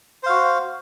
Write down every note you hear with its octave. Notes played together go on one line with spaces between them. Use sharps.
F#4 C5 F5